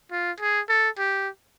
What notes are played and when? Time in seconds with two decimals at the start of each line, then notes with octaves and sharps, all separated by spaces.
0.11 F4
0.40 G#4
0.69 A4
0.98 G4